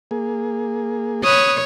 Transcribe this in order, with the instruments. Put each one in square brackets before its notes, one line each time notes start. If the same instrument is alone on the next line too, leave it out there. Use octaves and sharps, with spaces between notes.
[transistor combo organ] A#3 G#4
[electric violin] B4 D#6 [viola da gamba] C#5